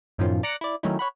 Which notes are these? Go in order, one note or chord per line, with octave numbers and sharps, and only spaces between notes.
F#2 A2 D#3 F3 C#4 F4
D5 A#5 D6 F#6 A#6 C#7
E4 D5
D#3 F#3 A3 C#4 D#4 E4
C#5 F#5 B5